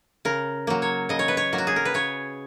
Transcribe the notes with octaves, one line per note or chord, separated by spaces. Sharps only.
C#3 A#4
F#3 A#3
C#5
C#3 D#5
C#5
B4
C#5
F#3 A#3
F#4
G#4
A#4
B4
C#3 C#5